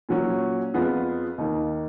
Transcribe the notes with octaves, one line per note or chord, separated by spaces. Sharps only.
A#2 F#3 C#4
F2 F3 B3 F4 G#4
D#2 D#3 A#3 D#4